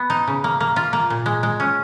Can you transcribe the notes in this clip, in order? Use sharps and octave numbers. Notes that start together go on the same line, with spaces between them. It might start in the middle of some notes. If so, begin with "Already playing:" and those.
Already playing: B3
D#4
C#3
A#3
A#3
F4
A#3
A#2
G#3
G#3
C#4